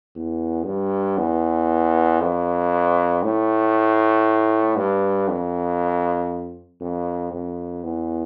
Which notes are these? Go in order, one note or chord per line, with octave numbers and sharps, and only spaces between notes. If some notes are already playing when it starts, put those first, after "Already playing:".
E2
G2
E2
F2
A2
G2
F2
F2
F2
E2